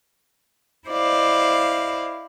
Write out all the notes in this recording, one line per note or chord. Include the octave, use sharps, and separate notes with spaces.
E4 C5 D5 D#5 F5